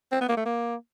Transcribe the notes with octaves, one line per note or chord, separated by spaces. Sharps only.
C4
B3
A#3
A3
A#3